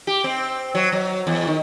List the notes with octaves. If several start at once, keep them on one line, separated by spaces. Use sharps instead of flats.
G4
C4
F#3
F#3
E2
D#3